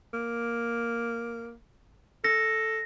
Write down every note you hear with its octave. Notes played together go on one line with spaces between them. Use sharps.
A#3
A4 A#6